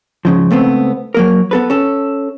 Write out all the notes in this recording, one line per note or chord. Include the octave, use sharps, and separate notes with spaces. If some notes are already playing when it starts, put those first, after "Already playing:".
G#2 C#3 F3
C#2 A3 B3 C4
F#3 A#3 A#4
B3 A4 B4
C#4 A4